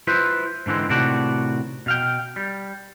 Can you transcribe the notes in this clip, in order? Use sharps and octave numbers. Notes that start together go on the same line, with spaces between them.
E4 F4 B4 C5 E5
G#2 D3 E3 G#3 C4
A2 C3 D#3 F#4 D5 A5
B2 F5 G5
G3